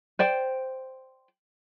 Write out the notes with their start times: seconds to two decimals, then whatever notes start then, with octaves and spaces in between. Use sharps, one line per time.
0.19 C5 D5 G5